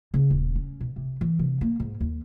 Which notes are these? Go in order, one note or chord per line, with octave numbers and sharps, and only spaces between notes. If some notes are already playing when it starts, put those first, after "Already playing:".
C#3
D#1
C#4
B2
C3
E3
C3
A#3
G#2
D#2